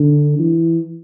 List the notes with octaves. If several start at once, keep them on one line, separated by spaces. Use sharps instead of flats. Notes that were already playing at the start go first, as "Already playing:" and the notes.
Already playing: D3
E3